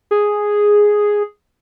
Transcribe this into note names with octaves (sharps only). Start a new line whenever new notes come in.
G#4